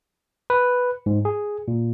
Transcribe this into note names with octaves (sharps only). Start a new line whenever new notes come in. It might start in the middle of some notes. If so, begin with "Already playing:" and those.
B4
G#2
G#4
A#2